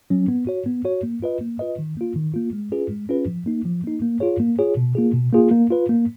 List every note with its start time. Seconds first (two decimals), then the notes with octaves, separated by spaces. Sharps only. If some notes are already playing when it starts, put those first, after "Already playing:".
0.10 F#3 C#4
0.28 B3
0.47 F#4 C#5
0.66 B3
0.85 F#4 C#5
1.03 A#3
1.22 F4 B4 D#5
1.41 A#3
1.59 F4 B4 D#5
1.79 D#3
1.97 A#3 F4
2.16 D#3
2.34 A#3 F4
2.53 G#3
2.72 C#4 F4 G#4 B4
2.90 G#3
3.09 C#4 F4 G#4 B4
3.27 F3
3.46 A#3 D#4
3.65 F3
3.84 A#3 D#4
4.02 A#3
4.20 F4 G#4 C#5
4.40 A#3
4.59 F4 G#4 C#5
4.77 B2
4.95 A#3 F4 G#4
5.14 B2
5.33 A#3 F4 G#4
5.51 A#3
5.71 F4 B4
5.89 A#3